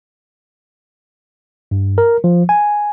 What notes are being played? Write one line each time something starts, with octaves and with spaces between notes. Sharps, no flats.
G2
A#4
F3
G#5